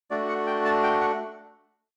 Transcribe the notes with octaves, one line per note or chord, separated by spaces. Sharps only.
A3 D4 F#4 D5
F#5
G5
A5
G5
F#5